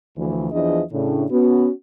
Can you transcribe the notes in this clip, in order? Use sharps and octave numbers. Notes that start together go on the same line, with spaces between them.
D2 E3 F3
E2 E3 F3 D4 G#4 D#5
A2 C#3 D4
B3 C#4 F#4